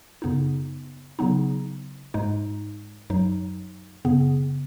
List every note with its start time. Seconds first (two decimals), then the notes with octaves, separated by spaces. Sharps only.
0.22 F#2 C#3 B3 D#4
1.19 C#3 F#3 B3 D#4
2.14 G#2 G#3 D#4
3.10 F#2 F#3 D#4
4.05 F#2 C#3 B3